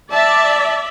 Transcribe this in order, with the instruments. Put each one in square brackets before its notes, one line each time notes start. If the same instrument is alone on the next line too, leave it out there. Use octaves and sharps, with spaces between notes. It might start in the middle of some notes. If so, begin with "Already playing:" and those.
[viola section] D5 E5 [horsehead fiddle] A5